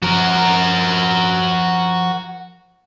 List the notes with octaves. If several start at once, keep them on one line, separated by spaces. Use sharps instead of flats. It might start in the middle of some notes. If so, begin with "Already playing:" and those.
F3 F#4 A#4